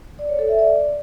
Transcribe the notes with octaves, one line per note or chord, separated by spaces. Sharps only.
D5
C#5
A4
E5
D5